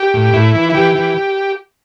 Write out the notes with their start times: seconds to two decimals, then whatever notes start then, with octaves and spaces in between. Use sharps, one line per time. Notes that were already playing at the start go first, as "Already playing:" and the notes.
Already playing: G4
0.14 A2
0.33 A2 E4
0.55 E3
0.70 E4
0.75 E3 G4
0.95 E3